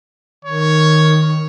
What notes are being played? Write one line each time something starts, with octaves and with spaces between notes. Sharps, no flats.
D#3 C#5